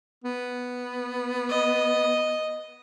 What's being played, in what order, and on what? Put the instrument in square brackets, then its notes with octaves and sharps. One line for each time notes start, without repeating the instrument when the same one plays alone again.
[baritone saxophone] B3
[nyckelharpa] D#5